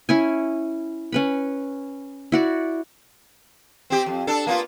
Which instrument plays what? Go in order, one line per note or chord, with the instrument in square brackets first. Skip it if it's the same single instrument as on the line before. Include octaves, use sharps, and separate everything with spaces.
[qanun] C#4 E4 G#5
C#4 B4 B5
E4 F#4 D5
[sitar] C4 G4
F2
D4 A4
A#3 B3 F4